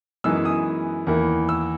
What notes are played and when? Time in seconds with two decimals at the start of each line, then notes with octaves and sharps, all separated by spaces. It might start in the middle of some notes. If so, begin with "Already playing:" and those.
0.24 F#2 E3 G#3 B3 D#4 E6
0.45 D#6
1.07 E2 D#3 A#3 E4
1.49 E6